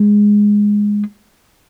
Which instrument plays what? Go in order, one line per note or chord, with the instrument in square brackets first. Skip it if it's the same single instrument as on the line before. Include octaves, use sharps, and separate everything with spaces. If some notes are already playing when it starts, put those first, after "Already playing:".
Already playing: [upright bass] G#3